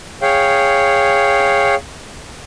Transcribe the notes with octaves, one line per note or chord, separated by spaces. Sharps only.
G#4 C#5 F5 G5